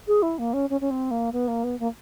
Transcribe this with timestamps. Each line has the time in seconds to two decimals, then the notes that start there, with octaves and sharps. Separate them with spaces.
0.08 G#4
0.22 E4
0.39 A#3
0.54 C#4
0.70 C#4
0.81 C#4
0.91 C4
1.11 A#3
1.33 B3
1.48 A#3
1.64 B3
1.80 A#3